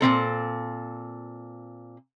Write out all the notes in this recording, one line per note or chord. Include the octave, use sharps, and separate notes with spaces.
A#2 F#3 C4 A4